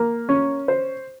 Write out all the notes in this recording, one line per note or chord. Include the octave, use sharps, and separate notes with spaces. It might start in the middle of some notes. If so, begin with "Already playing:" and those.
Already playing: A#3
C#4
C5